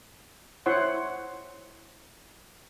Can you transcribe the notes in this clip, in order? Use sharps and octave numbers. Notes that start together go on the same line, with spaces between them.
E4 C5 C#5 F#5 C6